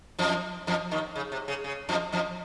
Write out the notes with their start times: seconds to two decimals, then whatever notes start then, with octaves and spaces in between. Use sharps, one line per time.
0.19 F2 F3
0.67 F2 F3
0.91 D#2 D#3
1.15 C#3
1.32 C3
1.48 C#3
1.64 C#3
1.89 F2 F3
2.13 F2 F3